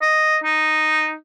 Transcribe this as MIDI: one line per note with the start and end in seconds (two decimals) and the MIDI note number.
0.02 0.38 75
0.44 1.14 63